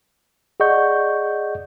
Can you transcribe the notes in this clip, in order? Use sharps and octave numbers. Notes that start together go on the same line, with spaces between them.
G#4 D5 D#5 F#5 C#6 G6